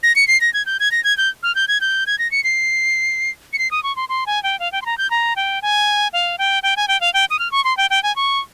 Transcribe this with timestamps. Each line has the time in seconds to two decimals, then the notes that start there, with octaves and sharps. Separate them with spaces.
0.03 A#6
0.16 C#7
0.28 C7
0.41 A#6
0.54 G#6
0.66 G6
0.80 G#6
0.92 A#6
1.04 G#6
1.18 G6
1.43 F6
1.55 G6
1.68 G#6
1.81 G6
2.07 G#6
2.19 A#6
2.32 C#7
2.44 C7
3.53 C#7
3.59 C7
3.71 D#6
3.83 C#6
3.96 C6
4.09 C6
4.27 G#5
4.43 G5
4.59 F5
4.72 G5
4.82 C6
4.86 A#5
4.98 G6
5.11 A#5
5.36 G5
5.62 G#5
6.13 F5
6.38 G5
6.63 G5
6.77 G#5
6.88 G5
7.01 F5
7.14 G5
7.30 D#6
7.39 F6
7.52 C#6
7.64 C6
7.77 G5
7.90 G5
8.03 G#5
8.16 C#6